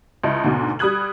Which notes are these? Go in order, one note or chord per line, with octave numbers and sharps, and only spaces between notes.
C#2 E4 D#5 A5
D2 G#2 B2
G3 B5 D#6 F#6 G#6 F#7